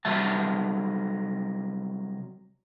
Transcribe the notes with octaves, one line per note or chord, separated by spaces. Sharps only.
C3 F#3 G3 E5 A5